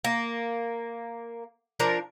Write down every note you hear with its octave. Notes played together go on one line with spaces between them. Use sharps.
A#3
F3 D4 A#4 A#5